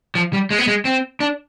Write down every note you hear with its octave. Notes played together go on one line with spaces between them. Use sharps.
F3
G3
G#3
B3
G#3
C4
D4